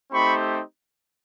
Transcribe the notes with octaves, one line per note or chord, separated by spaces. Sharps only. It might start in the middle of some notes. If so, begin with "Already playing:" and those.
A3 C4 D#4 G4 B5 C#6